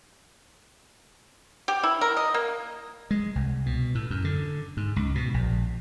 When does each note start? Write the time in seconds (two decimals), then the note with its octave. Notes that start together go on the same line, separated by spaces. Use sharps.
1.68 G4
1.83 E4
2.01 A#4
2.17 D#5
2.34 A#3
3.11 G#3
3.35 C2
3.66 B2
3.95 A2
4.10 F#2
4.24 D3
4.77 G#2
4.96 C#2
5.15 B2
5.34 A#1